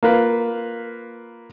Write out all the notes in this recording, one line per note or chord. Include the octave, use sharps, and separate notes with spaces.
A#3 F4 B4